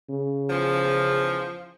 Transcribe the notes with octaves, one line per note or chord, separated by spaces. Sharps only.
C#3
E2 F3